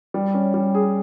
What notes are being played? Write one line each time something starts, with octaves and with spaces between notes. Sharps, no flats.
G3
C#4
G3
G#4